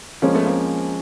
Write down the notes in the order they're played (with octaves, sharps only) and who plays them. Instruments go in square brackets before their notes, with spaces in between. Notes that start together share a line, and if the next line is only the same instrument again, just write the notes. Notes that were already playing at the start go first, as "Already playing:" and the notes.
[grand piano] F3 G#3 C#4 [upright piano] A#3 C4
[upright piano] A3 B3
A#3 C4